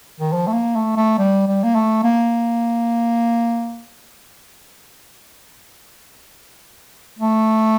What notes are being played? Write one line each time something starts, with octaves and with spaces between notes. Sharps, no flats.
D#3
F3
A3
A#3
A3
A3
G3
G3
A#3
A3
A#3
A3